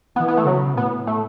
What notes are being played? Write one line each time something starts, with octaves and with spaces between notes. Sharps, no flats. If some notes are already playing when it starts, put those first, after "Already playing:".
E3 B3
B3
A3
C#3 F#3
A2 B3
A3